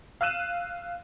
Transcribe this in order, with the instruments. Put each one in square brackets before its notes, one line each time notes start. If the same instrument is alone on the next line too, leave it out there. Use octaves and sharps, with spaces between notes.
[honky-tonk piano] F5 E6 F#6 D#7 E7